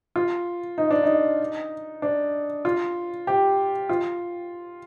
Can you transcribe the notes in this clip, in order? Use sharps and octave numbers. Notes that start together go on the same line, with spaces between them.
F4
D#4
D4
D#4
D4
F4
G4
F4